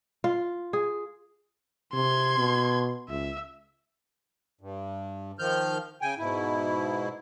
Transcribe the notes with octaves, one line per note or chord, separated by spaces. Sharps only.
F4
G#4
C3 C6 G#6
B2
C#2 E5
G2
D#3 F3 F6 G6
C#3 G5 G#5
G#2 B2 E4